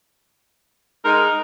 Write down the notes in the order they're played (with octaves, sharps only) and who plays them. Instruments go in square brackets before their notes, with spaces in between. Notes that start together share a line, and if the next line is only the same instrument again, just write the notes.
[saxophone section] G#3 D#4 [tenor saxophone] A#4